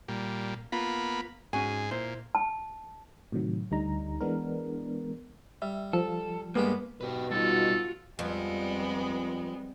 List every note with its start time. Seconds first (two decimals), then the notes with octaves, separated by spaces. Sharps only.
0.08 A#2 G3
0.72 A#3 B3 F4 B5
1.53 G#2 C#4 F#4 G#4 G#5
1.91 A#2 E4 C5
2.35 A5
3.32 A2 C3 D#3 F#3
3.71 D2 D3 G3 D#4 A#5
4.21 E3 G#3 B3 D4 A#4
5.62 G3 E5
5.93 F3 A4
6.55 G2 G#3 A#3 B3 G4
7.01 B2 G4 B4
7.31 G3 D#4 F4 F#4 A4
8.19 F2 G3 G#3 B3